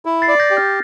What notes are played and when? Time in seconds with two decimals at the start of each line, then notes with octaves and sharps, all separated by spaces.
0.05 E4
0.22 A6 C7
0.28 D5
0.40 G6 A#6
0.51 G4
0.57 F6 A6